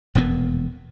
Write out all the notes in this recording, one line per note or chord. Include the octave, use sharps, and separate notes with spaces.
E1 F2 A#2 B3